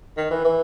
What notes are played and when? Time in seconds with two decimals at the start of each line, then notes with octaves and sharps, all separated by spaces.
0.17 D#3
0.31 E3
0.45 E3